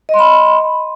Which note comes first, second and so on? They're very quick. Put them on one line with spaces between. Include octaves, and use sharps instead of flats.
D#5 C6 B5